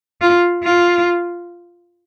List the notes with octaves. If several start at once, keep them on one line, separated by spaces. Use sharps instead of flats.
F4
F4